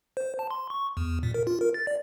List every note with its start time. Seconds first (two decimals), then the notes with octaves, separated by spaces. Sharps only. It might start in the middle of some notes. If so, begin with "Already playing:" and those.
0.17 C5
0.39 A5
0.51 C6
0.70 C#6
0.97 E2
1.23 A#2
1.34 A#4
1.47 F4
1.61 A#4
1.74 A6
1.87 D5